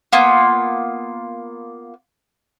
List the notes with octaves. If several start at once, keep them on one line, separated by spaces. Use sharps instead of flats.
A#3 B3 F4